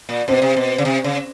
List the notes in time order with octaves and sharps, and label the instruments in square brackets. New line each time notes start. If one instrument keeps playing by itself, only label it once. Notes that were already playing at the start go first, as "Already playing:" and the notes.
[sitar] A#2
[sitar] B2 [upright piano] C4
[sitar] C3
B2
C#3
C3
C#3